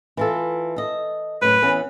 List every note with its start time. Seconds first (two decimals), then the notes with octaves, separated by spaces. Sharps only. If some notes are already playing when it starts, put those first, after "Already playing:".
0.17 E3 F4 A4
0.76 A4 D#5
1.42 F#2 A2 B4
1.62 E3 B3 C#4